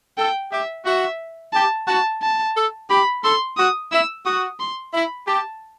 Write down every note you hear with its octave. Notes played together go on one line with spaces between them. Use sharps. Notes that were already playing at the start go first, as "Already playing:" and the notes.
A4 G5
G4 E5
F#4 E5
G4 A5
F#4 A5
A5
A4
G4 B5
A4 C6
F#4 D#6
E4 E6
F#4 D#6
C6
E4 B5
G4 A5